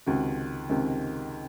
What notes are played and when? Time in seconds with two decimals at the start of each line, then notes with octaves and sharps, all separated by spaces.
0.06 C#2 C3 D#3 F#4
0.70 C#2 C3 D#3